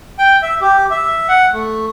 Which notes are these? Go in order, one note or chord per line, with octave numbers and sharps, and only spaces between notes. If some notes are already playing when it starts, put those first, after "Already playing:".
G5
E5
G4
E5
F#5
A3